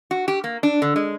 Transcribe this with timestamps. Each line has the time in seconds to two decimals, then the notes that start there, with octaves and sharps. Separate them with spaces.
0.11 F#4
0.28 G4
0.44 A#3
0.63 D4
0.82 D3
0.96 G#3